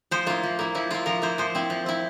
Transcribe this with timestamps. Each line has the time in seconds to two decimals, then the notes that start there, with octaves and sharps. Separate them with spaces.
0.11 F3 C5
0.26 A#3 E4 F4
0.43 F3
0.59 A#3 E4
0.75 F3 E4
0.91 A#3 E4 F4
1.06 F3 A#4
1.22 A#3 E4 C5
1.38 F3 C5
1.55 C4 E4
1.70 F3
1.86 C4 E4